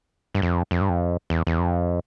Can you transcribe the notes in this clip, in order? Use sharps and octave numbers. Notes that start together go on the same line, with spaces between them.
G2
F2
F2
G2
F2
E2
E2
F2